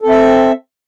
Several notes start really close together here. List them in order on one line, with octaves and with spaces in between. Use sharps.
A4 C4 E5